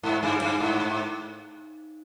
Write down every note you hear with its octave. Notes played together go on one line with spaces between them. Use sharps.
G#2
G2
G2
G#2